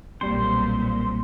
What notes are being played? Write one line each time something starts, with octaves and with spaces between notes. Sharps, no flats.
B1 A#2 G3 C4 C5